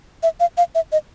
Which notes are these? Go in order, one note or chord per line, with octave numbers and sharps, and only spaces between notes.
E5
F5
F5
E5
D#5